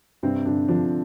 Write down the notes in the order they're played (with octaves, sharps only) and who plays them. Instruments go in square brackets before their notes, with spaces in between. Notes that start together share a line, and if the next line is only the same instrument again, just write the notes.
[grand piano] G2 [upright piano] C3 C4
[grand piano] G2 [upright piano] D3 D4
[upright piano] D3 D4 [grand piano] F3